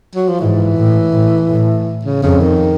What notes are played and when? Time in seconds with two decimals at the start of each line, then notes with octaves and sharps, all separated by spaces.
0.16 F#3
0.28 F3
0.40 G#2 E3
0.77 A2
1.13 A2
1.50 A2
2.05 C#3
2.23 F2 C#3
2.41 D#3